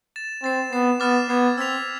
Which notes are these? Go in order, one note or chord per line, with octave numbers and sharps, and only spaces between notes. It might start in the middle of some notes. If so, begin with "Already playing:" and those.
A6 E7
C4 A6 C7 E7
B3 A6 C7 E7
B3 D6 F6 A6 E7
B3 D6 G#6 C7
C4 E6 G#6 B6 F7